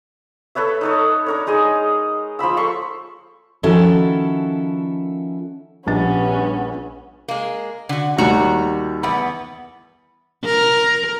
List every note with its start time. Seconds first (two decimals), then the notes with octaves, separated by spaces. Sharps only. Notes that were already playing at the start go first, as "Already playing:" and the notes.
0.55 A4 B4 C#5 E5
0.81 D#4 A4 C#5
1.26 D4 A#4 C#5
1.47 G#3 D#4 G#4 D#5
2.39 F3 A#3 B5 E6
2.57 A4 A#5 C6 C#6
3.63 D#3 F3 C#4 E4 F#4 A4
5.87 A#1 G2 B3 C#4 A6
7.28 G#3 A#3
7.89 D3 F#4
8.18 D#2 G3 F#4 A#5
9.03 E2 B3 B5
10.45 A#4